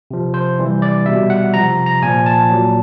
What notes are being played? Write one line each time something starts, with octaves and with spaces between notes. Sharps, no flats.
C3 F3
C5
C3 E3 G3
D5
B2 G3 E5
F#5
C3 F3 A#5
A#5
A#2 F3 G#5
A5
A#2 F#3